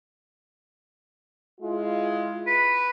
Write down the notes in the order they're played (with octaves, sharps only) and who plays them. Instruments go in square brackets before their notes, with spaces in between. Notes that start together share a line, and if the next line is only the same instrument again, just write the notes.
[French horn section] G#3 E4 F4
[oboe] B4